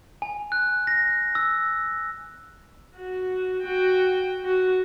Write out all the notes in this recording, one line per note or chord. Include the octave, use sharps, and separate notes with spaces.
G#5
F#6
A#6
E6
F#4
F#4 G5
F#4